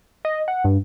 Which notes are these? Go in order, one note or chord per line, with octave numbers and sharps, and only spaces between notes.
D#5
F#5
G2